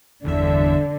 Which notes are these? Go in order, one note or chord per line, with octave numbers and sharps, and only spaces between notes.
G1 E2 D3 E5